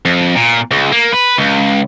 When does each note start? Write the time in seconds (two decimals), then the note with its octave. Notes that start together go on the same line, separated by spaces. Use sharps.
0.05 F2
0.35 A#2
0.71 C#2
0.92 A#3
1.12 B4
1.38 C#2